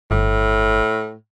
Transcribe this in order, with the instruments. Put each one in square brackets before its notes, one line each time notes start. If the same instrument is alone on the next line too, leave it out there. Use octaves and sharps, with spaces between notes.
[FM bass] G1 [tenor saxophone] A2